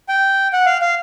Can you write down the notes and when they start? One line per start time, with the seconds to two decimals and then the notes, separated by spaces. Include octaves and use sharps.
0.08 G5
0.53 F#5
0.66 F5
0.82 F5